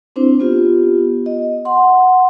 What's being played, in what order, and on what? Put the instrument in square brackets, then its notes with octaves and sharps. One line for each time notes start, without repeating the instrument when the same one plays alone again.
[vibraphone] C4 D4 E4 C5
B3 F4 G4
D#5
F#5 C6